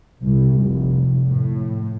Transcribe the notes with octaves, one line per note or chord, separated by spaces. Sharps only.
C2
F1
A2